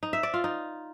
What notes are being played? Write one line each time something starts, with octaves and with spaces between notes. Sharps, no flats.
D#4
E5
D5
F4
D#4